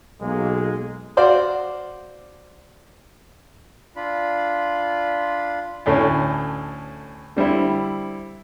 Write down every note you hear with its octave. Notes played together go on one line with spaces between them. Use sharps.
B1 G#3 A#3
F#4 C5 D5 F5
D4 F4 B5
D2 A2 A3 C#4
D3 G3 C4 E4